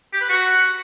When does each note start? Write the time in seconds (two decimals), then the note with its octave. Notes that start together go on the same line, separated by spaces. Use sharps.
0.13 G4
0.21 B4
0.29 F#4